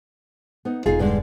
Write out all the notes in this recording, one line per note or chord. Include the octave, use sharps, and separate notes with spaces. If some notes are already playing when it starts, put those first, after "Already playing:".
B3 D#4
E1 D#4 F4 G#4
G2 D3 G#3